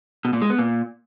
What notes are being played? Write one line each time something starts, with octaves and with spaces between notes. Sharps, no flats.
B2
A#2
G#3
B3
A#2